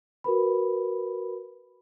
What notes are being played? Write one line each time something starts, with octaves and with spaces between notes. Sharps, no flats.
F#4 A#4 B4 B5